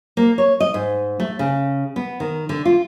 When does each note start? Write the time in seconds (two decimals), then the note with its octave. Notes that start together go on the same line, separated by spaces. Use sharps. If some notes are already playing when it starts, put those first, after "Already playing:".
0.17 A#3
0.38 C#5
0.60 D#5
0.74 G#2
1.20 A3
1.39 C#3
1.96 B3
2.20 D#3
2.49 D3
2.65 F4